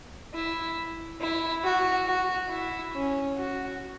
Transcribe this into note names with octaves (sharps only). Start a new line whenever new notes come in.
E4
E4
F#4
F#4
E4
C#4
F#4